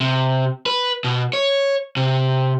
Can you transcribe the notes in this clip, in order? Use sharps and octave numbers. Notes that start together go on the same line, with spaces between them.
C3
B4
B2
C#5
C3